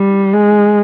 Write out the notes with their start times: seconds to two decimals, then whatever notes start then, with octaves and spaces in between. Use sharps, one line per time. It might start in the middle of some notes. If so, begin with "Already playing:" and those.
Already playing: G3
0.34 G#3